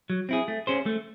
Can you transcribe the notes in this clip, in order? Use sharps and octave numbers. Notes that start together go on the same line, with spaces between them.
F#3
C4 E4 G#4
A3
C#4 G#4 C5
A3